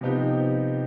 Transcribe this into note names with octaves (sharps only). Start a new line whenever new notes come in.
C3 F3 B3 D#4 G4